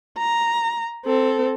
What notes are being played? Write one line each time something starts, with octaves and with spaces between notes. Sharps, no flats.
A#5
C4 A4